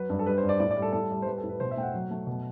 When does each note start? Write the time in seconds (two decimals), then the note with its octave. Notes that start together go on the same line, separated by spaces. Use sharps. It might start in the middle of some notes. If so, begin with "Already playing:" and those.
Already playing: F#3 B4
0.09 G2
0.19 A4
0.26 G3 B4
0.37 C5
0.43 G2
0.49 D5
0.60 A2 D5
0.71 D5
0.77 G3
0.82 A4
0.93 A2 A4
1.10 G3
1.22 C5
1.26 G3 B4
1.38 A4
1.43 A2
1.49 B4
1.60 B2 C5
1.71 E5
1.77 A3 G5
1.83 F#5
1.94 F#3
2.11 A3
2.27 B2